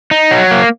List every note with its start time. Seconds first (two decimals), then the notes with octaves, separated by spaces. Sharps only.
0.11 D#4
0.31 F#3
0.51 A#3